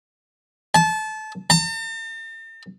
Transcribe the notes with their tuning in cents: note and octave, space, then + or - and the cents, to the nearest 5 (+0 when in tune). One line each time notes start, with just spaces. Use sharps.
A5 -25
A5 +45